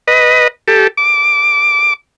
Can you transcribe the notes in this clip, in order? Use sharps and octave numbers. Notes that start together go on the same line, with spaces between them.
B4 D#5
G4 A4
D6